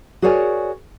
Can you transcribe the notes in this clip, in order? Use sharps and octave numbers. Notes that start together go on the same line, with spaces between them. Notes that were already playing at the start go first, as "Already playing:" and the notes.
F#4 G#4 A#4 C#5 D5 G#5